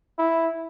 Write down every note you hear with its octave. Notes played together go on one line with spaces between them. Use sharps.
E4